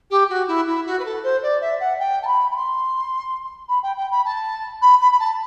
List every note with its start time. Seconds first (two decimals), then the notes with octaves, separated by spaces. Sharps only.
0.10 G4
0.29 F#4
0.48 E4
0.67 E4
0.86 F#4
0.99 B4
1.05 A4
1.23 C5
1.42 D5
1.61 E5
1.80 F#5
1.99 G5
2.22 A5
2.27 B5
2.51 B5
2.56 C6
3.68 B5
3.83 G5
3.97 G5
4.11 B5
4.25 A5
4.82 B5
5.01 B5
5.12 B5
5.19 A5